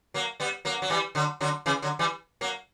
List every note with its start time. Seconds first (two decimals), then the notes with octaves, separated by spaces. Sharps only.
0.14 F#3 A#3
0.40 G3 B3
0.65 F#3 A#3
0.82 F#3
0.90 E3 G3
1.15 D3 F#3
1.41 D3 F#3
1.66 C#3 E3
1.82 D3 F#3
1.99 E3 G3
2.41 F#3 A#3